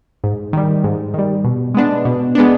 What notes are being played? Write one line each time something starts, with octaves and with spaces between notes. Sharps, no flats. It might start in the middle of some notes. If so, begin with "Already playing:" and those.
G#2
D#3 G3
G#2
D#3 G3
B2
G#3 B3 D4
B2
G#3 B3 D4